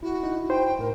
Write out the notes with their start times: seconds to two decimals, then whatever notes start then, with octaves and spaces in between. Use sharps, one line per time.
0.03 E4 F#4
0.23 D#4
0.50 C5 G5
0.79 A2 A#4